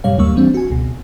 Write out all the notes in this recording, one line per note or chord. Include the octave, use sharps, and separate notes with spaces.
F#2 A2 C3 G3 C#5 F5
D#2 G3 A#3 C#6 E6
E3 G3 C4 D4
F#4 G#5
C#2 B2